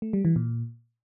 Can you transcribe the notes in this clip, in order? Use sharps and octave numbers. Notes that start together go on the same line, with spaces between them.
A3
G3
E3
A#2